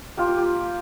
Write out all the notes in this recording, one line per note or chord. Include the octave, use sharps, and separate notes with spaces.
A#3 F4 G4
F4
G4